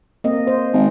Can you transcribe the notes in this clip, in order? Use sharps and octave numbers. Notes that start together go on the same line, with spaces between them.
A#3 C4 D#5
C5
G#1